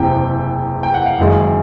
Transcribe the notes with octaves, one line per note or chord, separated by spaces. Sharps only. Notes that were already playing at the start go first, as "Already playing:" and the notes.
Already playing: F#1 E2 C3 E3 G5
G5
F#5
F5
F#1 F#2 D#3 G#3